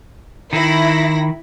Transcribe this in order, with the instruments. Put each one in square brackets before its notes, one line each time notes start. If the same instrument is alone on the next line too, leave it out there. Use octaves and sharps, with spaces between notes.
[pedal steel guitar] D#3 [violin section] E4 B5 A#6